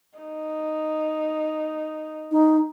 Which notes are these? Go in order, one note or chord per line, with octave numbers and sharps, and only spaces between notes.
D#4
D#4